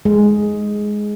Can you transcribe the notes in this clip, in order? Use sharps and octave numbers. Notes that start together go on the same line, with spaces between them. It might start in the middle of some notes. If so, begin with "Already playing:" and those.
G#3